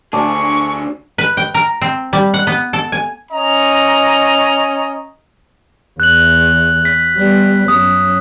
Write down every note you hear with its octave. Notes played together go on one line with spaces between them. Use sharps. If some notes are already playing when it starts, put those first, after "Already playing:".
D2 D4 G#4 A5 C#6 D6
B4
G5
A#4
C4
G3
F#5
B3
A4
G#5
C#4 D#5 A#5
E2 F#6 F#7
B6
G3 B3
F#2 D#6